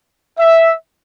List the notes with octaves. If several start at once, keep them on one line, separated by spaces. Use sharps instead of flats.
E5